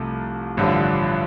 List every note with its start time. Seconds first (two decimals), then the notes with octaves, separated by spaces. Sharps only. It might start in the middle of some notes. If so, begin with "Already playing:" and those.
Already playing: C2 C3 F3 A3
0.57 A1 G2 D3 F3